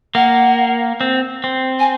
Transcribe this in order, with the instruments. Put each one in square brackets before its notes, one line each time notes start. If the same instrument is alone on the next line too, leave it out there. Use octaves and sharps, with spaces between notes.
[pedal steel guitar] A#3 [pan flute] F#5
[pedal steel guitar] C4
C4
[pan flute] G#5